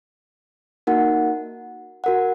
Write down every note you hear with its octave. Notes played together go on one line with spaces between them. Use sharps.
A#3 D#4 F#4 A#4 F#5
F#4 A#4 F#5